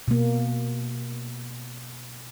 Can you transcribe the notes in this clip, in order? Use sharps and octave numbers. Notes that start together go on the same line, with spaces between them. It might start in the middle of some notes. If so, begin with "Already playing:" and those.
B2 A#3